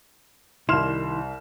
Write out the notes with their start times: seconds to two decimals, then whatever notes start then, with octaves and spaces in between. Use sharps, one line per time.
0.69 C2 D#3 E4 C6 F6 E7